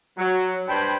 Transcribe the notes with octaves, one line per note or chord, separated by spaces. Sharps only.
F#3
G2 G3 C5 G5 A5 B5